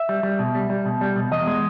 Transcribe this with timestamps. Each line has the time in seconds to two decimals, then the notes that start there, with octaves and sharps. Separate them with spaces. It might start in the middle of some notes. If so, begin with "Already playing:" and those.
Already playing: E5
0.09 G3
0.23 G3
0.39 B2
0.55 G3
0.70 G3
0.86 B2
1.01 G3
1.16 B2
1.31 E2 D#5
1.47 G#3